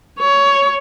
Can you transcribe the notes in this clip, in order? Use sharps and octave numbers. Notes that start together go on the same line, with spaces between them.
C#5